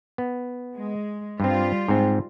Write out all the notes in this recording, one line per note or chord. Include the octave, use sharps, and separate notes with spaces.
B3
G#3
G2 G3 C4 F4
G#2 C4 G5